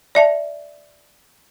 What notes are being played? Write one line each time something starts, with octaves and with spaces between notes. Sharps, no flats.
D5 E5 A5